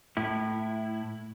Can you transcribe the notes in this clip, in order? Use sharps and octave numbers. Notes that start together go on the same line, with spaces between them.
A2 E4